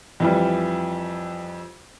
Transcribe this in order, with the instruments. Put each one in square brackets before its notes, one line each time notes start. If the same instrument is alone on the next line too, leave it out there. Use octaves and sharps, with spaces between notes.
[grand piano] F2 E3 G3